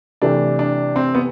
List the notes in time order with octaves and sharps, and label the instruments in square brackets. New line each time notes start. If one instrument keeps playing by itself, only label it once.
[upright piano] C3 E3 A3 [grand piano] D4
[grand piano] D4
C4
B3